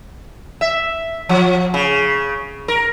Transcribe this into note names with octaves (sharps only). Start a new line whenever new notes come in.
E5
F3
C#3
A#4